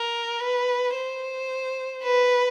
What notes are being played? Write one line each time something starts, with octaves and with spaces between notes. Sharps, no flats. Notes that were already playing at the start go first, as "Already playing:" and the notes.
Already playing: A#4
B4
C5
B4